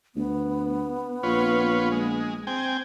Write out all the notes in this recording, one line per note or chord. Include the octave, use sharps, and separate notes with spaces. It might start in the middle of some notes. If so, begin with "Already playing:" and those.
D2 B3
A#1 F4 B4 C#5
G#3
C4 G5 G#5